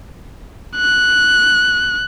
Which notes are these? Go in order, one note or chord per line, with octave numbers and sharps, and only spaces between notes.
F#6